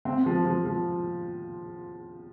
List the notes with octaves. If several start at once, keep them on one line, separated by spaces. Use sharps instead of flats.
C4
F3
F3
F3